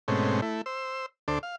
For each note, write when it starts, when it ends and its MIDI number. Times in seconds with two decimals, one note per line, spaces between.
0.08 0.41 44
0.08 0.41 47
0.08 0.41 57
0.08 0.41 60
0.08 0.41 61
0.42 0.61 57
0.42 0.61 64
0.66 1.06 72
0.66 1.06 88
1.28 1.39 38
1.28 1.39 62
1.28 1.39 69
1.28 1.39 72
1.28 1.39 86
1.43 1.56 77